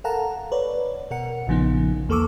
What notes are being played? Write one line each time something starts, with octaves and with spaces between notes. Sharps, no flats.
A4 A#4 F5 F#5 A5 A#5
B4 C#5 D5
B2 A#4 F#5 C#7
A#1 A#2 C#3 F3 B3 D#4
E2 A#3 A4 C#6 D6 E6